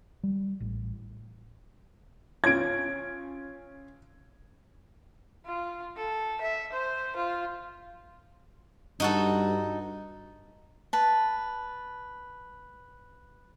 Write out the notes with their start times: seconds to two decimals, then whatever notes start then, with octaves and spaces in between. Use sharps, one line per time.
0.23 G3
0.60 A1
2.44 C#4 F4 C#5 G#6 D7
5.46 F4
5.96 A4
6.41 E5
6.72 C5
7.16 F4
9.00 G2 D#4 F#4 A4
10.93 B4 A5